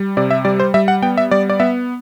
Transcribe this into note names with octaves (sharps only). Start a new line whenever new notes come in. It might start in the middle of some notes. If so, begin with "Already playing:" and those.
Already playing: G3
C3 D5
E5
G3 D5
C5
G3 E5
F#5
B3 G5
E5
G3 D5
D5
B3 E5